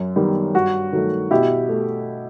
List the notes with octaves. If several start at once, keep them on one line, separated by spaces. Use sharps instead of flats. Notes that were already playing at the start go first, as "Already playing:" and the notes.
Already playing: F#2
D#3 G3 B3
G2 F#4
D#3 F#3 A3
B2 E4 G4
A3